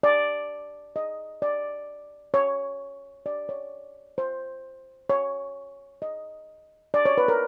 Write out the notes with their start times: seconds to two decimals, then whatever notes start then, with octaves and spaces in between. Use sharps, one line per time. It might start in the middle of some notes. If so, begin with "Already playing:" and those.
0.03 D5
0.96 D#5
1.42 D5
2.34 C#5
3.26 D5
3.49 C#5
4.18 C5
5.10 C#5
6.02 D#5
6.94 D5
7.05 C#5
7.18 B4
7.28 A#4